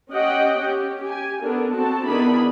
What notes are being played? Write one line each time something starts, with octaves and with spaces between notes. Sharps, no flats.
C#4 G4 D#5 F#5 G5
C#4 G4
G4 G#5
B3 D4 A4 A#4
C4 F#4 A4 A5
D#3 B3 D4 E4 G#4 B5